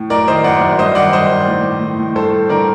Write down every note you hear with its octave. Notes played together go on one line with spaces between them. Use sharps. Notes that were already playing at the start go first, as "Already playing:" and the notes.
Already playing: A2
F#2 A#4 D5
D#3 C5 D#5
F#2 D5 F#5
F#2
G2 C5 D#5
D#3 D5 F#5
D#3 C5 D#5
D#3
A2
A2
A2
A2
G2 A4 C5
G2
D3 A#4 D5